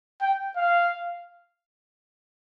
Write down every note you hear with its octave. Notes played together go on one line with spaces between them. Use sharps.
G5
F5